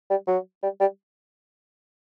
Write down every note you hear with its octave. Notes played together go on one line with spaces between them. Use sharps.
G3
F#3
G3
G3